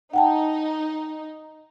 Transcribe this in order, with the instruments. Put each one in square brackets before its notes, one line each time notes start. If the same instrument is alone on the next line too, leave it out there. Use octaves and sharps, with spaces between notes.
[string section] D#4 [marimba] F#5 G5 A5